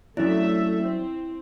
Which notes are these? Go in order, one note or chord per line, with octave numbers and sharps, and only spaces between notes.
F#3 A3 C#4 D4 E4 E5
C4